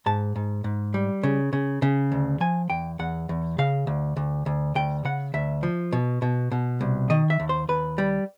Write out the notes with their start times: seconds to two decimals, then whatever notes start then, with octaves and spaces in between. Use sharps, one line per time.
0.06 G#2 A5
0.36 G#2
0.64 G#2
0.94 G3
1.23 C#3
1.53 C#3
1.82 C#3
2.12 D2
2.40 F3 G#5
2.70 E2 G5
2.99 E2 F#5
3.29 E2
3.58 C#3 F5
3.87 D2
4.17 D2
4.46 D2
4.75 D2 G5
5.05 C#3 F#5
5.34 D2 E5
5.63 F3
5.93 B2
6.22 B2
6.52 B2
6.81 C2
7.10 D#3 D#5
7.30 E5
7.40 D#2
7.49 C5
7.69 D#2 B4
7.98 G3